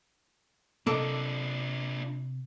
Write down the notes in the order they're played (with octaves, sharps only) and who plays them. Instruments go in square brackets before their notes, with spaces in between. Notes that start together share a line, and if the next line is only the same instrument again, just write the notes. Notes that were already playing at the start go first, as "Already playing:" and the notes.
[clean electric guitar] C3 [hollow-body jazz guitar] A#3 D#5 [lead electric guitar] D4 F4 [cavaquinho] A4 D6